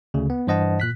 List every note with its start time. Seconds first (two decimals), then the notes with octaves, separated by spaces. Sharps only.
0.14 D2 C#3
0.30 B3
0.47 G2 E3 C5 D#5 F#5 A5
0.80 A#2 F#6 B6